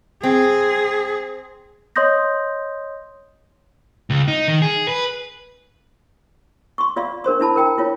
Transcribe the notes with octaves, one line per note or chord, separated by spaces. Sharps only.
C4 G#4
C#5 D#5 C6 D#6 G6 A#6
C#2
D#4
D#3
G#4
B4
C6 C#6
F4 D5 F5 C6
D4 A#4 C5 C6
D4 E4 A5 B5
A#4 G5 A#5
E4 F4 C#5